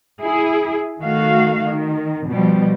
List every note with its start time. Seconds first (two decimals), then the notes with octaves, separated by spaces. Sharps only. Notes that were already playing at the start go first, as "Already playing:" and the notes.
0.21 E4 G#4
0.99 D#3 A3 F#4 F5
1.64 D#3
2.29 B2 F3 G3